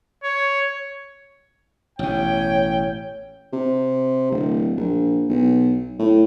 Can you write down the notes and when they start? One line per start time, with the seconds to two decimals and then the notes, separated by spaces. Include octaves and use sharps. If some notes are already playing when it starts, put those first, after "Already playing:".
0.24 C#5
1.99 A1 B2 C#5 G5
3.53 C3
4.32 D1
4.77 A#1
5.29 B1
5.99 A2